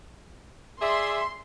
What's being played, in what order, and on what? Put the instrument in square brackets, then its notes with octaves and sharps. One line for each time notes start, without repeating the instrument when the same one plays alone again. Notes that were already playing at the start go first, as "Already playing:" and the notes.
[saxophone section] G#4 D5 E5 [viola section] C6